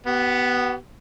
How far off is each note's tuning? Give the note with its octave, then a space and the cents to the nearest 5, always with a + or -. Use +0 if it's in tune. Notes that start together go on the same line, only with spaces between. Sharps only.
B3 +0 G4 -40